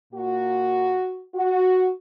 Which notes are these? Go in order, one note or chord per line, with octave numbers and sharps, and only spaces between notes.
A#2 A#3 F#4
F#4